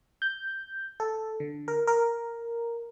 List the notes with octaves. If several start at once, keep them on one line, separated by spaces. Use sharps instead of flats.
G6
A4
D3
A#4
A#4